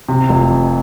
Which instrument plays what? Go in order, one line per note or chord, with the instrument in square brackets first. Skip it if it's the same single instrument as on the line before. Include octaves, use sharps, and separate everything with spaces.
[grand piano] C3
F1
F2